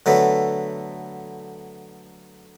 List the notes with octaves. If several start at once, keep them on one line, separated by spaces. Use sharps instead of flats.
D3 F#3 A3 B3